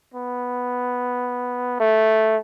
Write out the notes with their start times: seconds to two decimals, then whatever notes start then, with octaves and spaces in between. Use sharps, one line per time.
0.14 B3
1.80 A3